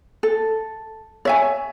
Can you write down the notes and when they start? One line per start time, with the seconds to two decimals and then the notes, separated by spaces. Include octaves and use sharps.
0.23 A4
1.25 C#5 E5 G#5